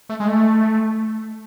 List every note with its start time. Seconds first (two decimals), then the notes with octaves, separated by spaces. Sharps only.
0.09 A3
0.20 G#3
0.28 A3